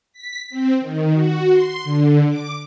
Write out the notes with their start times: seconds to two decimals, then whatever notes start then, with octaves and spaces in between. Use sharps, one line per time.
0.13 B6
0.50 C4
0.81 D#3
1.13 F#4
1.52 C6
1.84 D3
2.29 D6